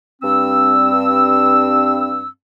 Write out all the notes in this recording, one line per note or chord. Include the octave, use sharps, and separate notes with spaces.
G2 C4 E6